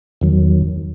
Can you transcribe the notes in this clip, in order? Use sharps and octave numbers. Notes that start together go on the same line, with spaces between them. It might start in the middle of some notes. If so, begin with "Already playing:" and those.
E2 D#3 F#3